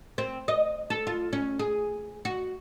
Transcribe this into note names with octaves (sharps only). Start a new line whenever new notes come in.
C4
D#5
A4
F4
C#4
G#4
F#4